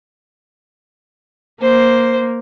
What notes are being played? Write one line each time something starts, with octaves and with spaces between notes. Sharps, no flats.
A#3 C5